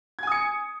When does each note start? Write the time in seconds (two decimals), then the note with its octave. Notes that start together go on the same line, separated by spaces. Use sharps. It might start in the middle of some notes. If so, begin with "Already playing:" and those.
0.19 G#6
0.23 G#5
0.27 D#6
0.32 C#7